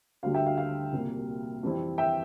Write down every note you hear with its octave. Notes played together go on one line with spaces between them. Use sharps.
D2 D3 G3 F5
E5 G5
F5
F5
C2 A#2 G3 A#3
F2 E3 G3 C4 E4
E5 G5